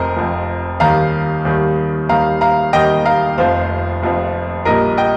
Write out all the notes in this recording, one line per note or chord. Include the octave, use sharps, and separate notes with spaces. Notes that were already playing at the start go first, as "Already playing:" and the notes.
Already playing: F1 F2 A#4 C5 D#5
F1 F2 F3
D#2 D#3 G3 F5 A#5
D#2 D#3 G3
D#2 D#3 G3 F5 A#5
F5 A#5
D#2 D#3 G3 D#5 G5
F5 A#5
F1 F2 F3 C5 F5
F1 F2 F3
A#1 A#2 G3 A#4 D#5
D#5 G5